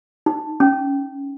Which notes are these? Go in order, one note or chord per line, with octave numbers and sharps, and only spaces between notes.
D#4
C#4